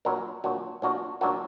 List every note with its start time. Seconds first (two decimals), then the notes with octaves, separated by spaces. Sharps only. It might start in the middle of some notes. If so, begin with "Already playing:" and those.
0.05 A#2 F#3 D4 F#4 A#4
0.44 A#2 F#3 D4 F#4 A#4
0.82 A#2 F#3 D4 F#4 A#4
1.21 A#2 F#3 D4 F#4 A#4